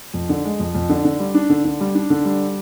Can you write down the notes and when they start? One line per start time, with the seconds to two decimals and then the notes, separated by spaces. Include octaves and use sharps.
0.14 F2
0.29 D3
0.45 G#3
0.59 F2
0.75 F2
0.89 D3
1.05 D3
1.19 G3
1.34 D4
1.50 D3
1.65 D3
1.80 G3
1.95 D4
2.10 D3
2.25 G3